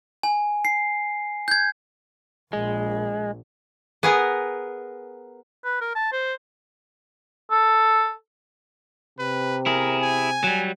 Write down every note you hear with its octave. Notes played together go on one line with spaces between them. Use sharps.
G#5
C7
G6 G#6
A#1 G#3
B3 G#4 A#4
B4
A#4
A5
C5
A4
C3 B4
E4 G#4 A#4
G#5
F#3 G3